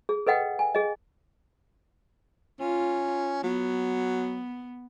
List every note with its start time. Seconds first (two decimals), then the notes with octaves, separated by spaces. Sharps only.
0.09 G#4
0.27 A4 B4 D#5 F#5 G5
0.59 G#5
0.75 G#4 D#5
2.60 C#4 F4
3.43 F#3 B3